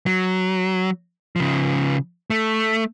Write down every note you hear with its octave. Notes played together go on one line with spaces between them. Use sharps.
F#3
C#3 F3
A3